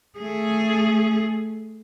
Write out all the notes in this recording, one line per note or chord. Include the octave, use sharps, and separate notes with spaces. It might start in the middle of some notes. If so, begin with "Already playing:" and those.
A3 G#4